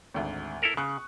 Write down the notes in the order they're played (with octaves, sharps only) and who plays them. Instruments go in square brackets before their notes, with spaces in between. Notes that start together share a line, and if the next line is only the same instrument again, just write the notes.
[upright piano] G#1 D2
[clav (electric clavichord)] E4 A4 A#4
[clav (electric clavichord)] C#3 [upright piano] C#6 D#6 F#6